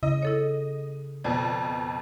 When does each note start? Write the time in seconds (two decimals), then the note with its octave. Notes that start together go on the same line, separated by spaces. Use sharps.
0.03 C#3 E4 D#5
0.23 E4 A4 C#5
1.24 F2 B2 D5